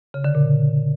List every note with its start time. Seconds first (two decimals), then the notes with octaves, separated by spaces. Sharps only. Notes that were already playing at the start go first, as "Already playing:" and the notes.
0.14 C#3
0.24 D3
0.35 A#2